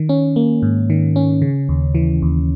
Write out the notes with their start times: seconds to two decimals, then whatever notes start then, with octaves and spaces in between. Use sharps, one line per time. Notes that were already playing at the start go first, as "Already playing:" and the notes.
Already playing: D#3
0.09 C#4
0.36 A#3
0.62 G#2
0.90 D#3
1.16 C#4
1.42 C#3
1.69 D#2
1.95 E3
2.22 D#2